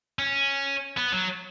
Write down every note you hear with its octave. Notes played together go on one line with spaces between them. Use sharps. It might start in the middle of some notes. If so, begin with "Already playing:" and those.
C#4
B3
F#3